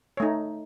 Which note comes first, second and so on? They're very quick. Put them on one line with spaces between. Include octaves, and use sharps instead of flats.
C#5 A3 D#4